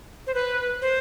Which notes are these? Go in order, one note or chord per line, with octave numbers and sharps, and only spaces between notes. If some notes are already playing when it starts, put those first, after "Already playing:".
C5
B4
C5